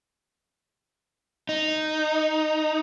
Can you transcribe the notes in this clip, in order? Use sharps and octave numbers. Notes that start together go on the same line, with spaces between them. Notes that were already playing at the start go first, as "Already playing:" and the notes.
D#4